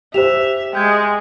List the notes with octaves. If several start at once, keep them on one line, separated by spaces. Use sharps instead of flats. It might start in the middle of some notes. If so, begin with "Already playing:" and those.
G4 C5 E5 E7 F7
G#3 G5 G6 G#6